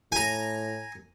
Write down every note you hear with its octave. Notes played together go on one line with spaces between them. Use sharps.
A2 G#5 A#5